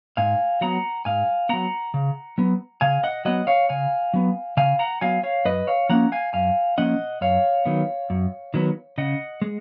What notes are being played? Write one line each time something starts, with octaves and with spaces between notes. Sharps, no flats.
G#2 F5 G#5
F#3 B3 F#5 A#5
G#2 F5 G#5
F#3 B3 F#5 A#5
C#3
F#3 B3
C#3 F5 G#5
D#5 F#5
F#3 B3 D#5 F#5
C#5 F5
C#3 F5 G#5
F#3 B3
C#3 F5 G#5
F#5 A#5
F#3 B3 F5 G#5
C#5 F5
F#2 B4 D#5
C#5 F5
F3 A#3 C#4 F#5 A#5
F5 G#5
F#2 F5 G#5
F3 A#3 C#4 D#5 F#5
F#2 C#5 F5
D#3 F#3 B3
F#2
D#3 F#3 B3
C#3 D#5 F#5
G#3